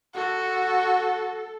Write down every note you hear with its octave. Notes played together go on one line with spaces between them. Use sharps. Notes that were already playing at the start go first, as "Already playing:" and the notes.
F#4 A4